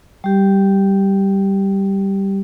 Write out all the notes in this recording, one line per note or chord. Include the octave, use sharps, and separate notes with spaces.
G3 G4